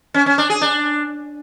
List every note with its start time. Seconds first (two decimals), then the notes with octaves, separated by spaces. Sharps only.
0.14 C#4
0.26 C#4
0.38 D4
0.50 G#4
0.61 D4